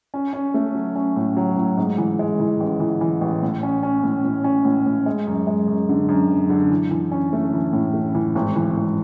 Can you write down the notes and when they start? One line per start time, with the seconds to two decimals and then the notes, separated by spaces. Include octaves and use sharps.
0.14 C#4
0.33 C#4
0.54 A3
0.75 F#3
0.95 C#4
1.16 A2
1.37 F#3
1.57 A2
1.77 G#2
1.98 E3
2.19 G#3
2.40 E3
2.60 A1
2.80 E3
3.01 E3
3.21 A1
3.42 A2
3.63 C#4
3.83 C#4
4.04 A2
4.24 A2
4.44 C#4
4.65 A2
4.86 A2
5.06 G#3
5.27 F#2
5.47 G#3
5.68 F#2
5.89 D3
6.09 F#2
6.29 F#1
6.50 D3
6.71 E3
6.91 E3
7.12 C#4
7.33 A3
7.53 E3
7.73 A2
7.93 A3
8.15 E3
8.35 G#1
8.56 E3
8.77 G#1